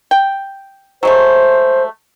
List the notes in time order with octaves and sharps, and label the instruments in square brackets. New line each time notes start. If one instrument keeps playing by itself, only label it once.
[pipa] G5
[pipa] F#3 G#3 A3 [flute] C5